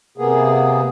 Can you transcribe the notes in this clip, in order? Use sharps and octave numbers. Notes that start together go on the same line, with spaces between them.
C3 A#3 B3 G#4